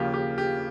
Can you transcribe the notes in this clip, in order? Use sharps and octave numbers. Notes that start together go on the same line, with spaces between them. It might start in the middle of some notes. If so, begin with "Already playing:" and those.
Already playing: D#2 C#3 F3 A#3 G4
G4
G4